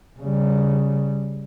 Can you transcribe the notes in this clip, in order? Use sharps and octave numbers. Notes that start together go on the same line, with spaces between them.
C#3 G3